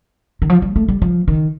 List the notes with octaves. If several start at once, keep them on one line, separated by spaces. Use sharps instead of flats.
D#3
F3
G3
A3
G3
F3
D#3